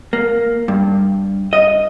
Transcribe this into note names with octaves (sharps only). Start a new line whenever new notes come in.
A#3
G2
D#5